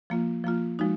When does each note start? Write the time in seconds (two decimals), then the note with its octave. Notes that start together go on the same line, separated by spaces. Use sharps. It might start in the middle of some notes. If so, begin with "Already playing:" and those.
0.10 F3 A#3 F4
0.44 F3 A#3 F4
0.79 F3 G#3 D#4 F#4